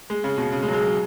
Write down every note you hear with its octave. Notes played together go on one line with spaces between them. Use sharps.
G#3
C#3
B2
C#3
G#3
F#3
G#3
F#3